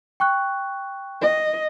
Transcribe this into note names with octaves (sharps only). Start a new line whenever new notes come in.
G5 C#6 F#6
D#5